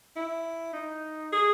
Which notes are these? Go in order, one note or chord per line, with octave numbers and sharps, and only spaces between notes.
E4
D#4
G#4